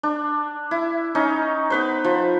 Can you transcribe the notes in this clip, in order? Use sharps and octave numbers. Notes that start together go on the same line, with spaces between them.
D4
E4
C#4 D#4
B3 B4 C5
F3